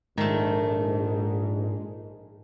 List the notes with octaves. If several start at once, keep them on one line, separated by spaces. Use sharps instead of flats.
A#1 G#2 D#3 G#3 A3